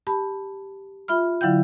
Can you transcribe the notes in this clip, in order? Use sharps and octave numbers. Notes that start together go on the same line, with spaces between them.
G4 A5 B5
F4 E5 B5 F6
D3 F#3 E4 F5 G5 G6